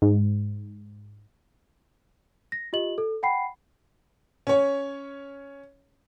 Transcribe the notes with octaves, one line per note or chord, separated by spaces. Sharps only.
G#2
A#6
F4 G4 D#5 F#7
A4
F#5 G5 B5 C7
C#4 C#5